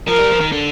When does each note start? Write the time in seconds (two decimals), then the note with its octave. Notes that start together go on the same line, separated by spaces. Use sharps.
0.08 F3 A#4
0.19 G3
0.30 F3
0.41 D#3
0.52 D3